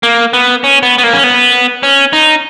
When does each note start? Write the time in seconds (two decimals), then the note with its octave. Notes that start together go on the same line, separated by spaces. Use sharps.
0.03 A#3
0.33 B3
0.64 C#4
0.83 B3
0.98 B3
1.04 A#3
1.13 C#4
1.24 B3
1.83 C#4
2.13 D#4